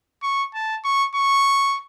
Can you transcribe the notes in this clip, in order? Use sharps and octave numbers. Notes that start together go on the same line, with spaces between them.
C#6
A5
C#6
C#6